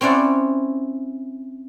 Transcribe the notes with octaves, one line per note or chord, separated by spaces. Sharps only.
C4 C#4 E4 D5 F#5